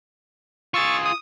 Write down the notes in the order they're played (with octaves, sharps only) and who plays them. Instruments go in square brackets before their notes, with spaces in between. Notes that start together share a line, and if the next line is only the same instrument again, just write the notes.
[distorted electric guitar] F4 G#4 [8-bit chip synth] C#6 E6 A6
[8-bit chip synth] D#6